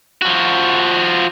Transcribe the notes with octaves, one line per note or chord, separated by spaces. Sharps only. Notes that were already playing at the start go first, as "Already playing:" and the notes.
F3 F#4